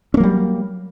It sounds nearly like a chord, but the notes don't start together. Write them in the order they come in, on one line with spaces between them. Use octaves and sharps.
C#4 A#3 F#3 G3